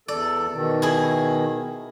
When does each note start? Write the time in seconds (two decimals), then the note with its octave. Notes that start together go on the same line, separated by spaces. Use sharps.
0.08 E2 A4 D5
0.53 B2 D#3
0.82 E4 G#4